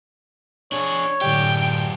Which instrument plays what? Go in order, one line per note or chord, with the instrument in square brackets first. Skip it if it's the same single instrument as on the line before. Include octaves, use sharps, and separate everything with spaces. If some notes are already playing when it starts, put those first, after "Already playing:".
[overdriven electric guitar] D4 G#4 [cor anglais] C#5
[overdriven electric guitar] F#2 G4 [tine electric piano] A2 D3 D5 [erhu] G5